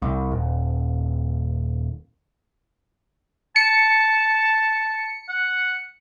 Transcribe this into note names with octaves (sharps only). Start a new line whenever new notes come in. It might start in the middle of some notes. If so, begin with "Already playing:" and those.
C2
D#1
A5 C#7
F#5